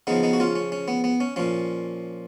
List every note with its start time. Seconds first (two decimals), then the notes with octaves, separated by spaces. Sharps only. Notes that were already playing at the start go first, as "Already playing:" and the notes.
0.07 C#3 F3 B3 D#4
0.23 B3 D#4
0.33 F#4
0.40 C#4 F4
0.55 C#4
0.72 C#4
0.88 B3
1.04 B3
1.20 C#4
1.36 A#2 F3 C#4